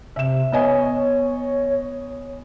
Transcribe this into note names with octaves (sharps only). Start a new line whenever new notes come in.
C3 E5 E7
B3 C#5 D#5 G#5